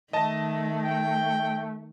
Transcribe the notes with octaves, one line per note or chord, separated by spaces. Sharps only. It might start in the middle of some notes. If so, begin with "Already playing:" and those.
D#3 A3 D#5 A5
G5